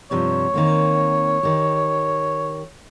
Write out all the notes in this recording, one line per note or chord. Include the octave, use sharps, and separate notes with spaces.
G2 C3 F3 C#5
D#3 A#3 C4
D#3 G4